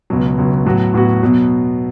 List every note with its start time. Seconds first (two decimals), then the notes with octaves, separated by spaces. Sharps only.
0.10 C#2 B2 F#3
0.38 C#2 B2 F#3
0.65 A2 F#3 B3 F#4
0.94 A2 F#3 B3 F#4
1.22 B2 F#3 B3